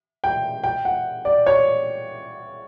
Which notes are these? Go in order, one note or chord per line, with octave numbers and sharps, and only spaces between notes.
G5
G5
F#5
D5
C#5